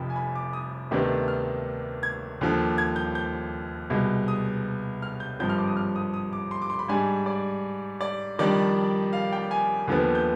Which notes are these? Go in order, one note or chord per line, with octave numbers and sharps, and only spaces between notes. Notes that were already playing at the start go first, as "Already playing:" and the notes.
Already playing: F1 F2 C3 B5
G#5
B5
D6
D#6
D2 C3 D#3 B3 D4
F6
G#6
D#2 D3 F3
G#6
G6
G6
C2 B2 G#3
D#6
F6
G6
G#1 G2 F3 C4 G6
F6
D6
D#6
F6
D#6
D#6
D6
C6
D6
C6
B5
G#2 G3 D4 G#5
D5
D5
F2 D#3 G3 D4 D5
F5
G5
G#5
D#2 D3 F3 B3
G6